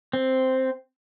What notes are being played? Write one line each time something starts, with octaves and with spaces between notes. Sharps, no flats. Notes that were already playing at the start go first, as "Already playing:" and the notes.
C4